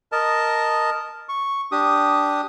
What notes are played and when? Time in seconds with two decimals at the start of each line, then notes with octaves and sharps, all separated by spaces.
0.12 A#4 D#5 A5
1.29 C#6
1.72 D4 G4 D#6